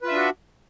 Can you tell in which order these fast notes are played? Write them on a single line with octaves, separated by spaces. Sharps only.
B4 F4 E5 D4 F#4